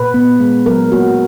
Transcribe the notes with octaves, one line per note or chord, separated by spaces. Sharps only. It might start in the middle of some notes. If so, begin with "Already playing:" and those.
Already playing: A#2 B4
B3
G#3
F#3 A#4
A#3 F#4